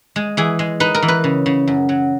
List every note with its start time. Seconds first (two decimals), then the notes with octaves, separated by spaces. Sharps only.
0.16 G#3
0.37 E3 G#4
0.59 G#3
0.80 D#4 B4
0.95 A#4
1.02 E3
1.08 B4
1.24 C#3
1.46 C#3
1.67 F#2
1.89 F#3